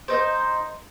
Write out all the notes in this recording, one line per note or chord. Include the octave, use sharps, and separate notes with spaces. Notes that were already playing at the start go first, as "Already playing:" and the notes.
D#4 C5